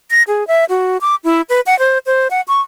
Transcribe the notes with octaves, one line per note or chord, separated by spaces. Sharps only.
A#6
G#4
E5
F#4
D6
E4
B4
F#5
C5
C5
F#5
C#6